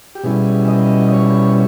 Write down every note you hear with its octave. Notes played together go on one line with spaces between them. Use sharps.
G4
B2 G3 C#4 E4 G#4
D#5
C#5